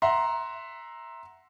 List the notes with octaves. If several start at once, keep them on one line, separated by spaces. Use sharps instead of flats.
E5 F#5 A#5 C6